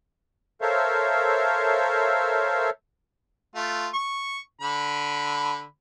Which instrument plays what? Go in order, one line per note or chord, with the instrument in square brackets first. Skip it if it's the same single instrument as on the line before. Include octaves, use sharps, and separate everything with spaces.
[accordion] A4 A#4 C5 C#5 E5 F5
[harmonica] A3 F4
C#6
D3 B5